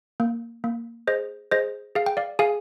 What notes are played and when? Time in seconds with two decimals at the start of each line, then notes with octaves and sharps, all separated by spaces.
0.20 A#3
0.64 A#3
1.07 G#4 C5 D#5
1.51 G#4 C5 D#5
1.95 G#4 F5
2.06 G5
2.17 D5 F5
2.39 G#4 F5 G#5